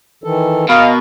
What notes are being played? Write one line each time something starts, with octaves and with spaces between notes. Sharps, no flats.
D#3 E3 A4
B2 A#4 D#5 F5